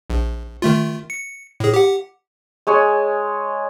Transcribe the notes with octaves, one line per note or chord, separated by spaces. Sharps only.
A#1
D#3 A3 F4
C#7
A2 G#4
G4 F#5
G#3 C#5 G#5 C#6